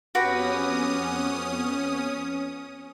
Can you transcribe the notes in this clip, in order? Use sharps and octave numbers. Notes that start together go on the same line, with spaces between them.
F2 B3 C#4 F#4 G4 B4 D#6 F6